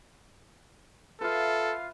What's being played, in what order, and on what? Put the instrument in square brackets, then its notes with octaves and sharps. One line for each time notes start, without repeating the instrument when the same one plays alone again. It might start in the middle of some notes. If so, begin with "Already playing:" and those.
[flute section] F4 F5 [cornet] A4 [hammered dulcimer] B4 E5